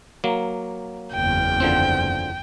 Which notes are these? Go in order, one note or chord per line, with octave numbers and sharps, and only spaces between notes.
F#3 A#3
F#1 E2 G5
D3 F3 C4